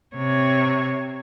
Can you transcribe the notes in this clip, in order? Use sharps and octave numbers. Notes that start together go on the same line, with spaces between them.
C3 C#5